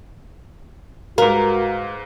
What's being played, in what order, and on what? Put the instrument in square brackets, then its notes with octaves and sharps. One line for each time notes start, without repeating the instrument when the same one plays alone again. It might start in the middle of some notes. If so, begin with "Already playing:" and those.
[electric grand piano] G#2 B4 F5 [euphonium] F#4 [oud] A#4